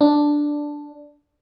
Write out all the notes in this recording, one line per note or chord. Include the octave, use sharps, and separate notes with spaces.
D4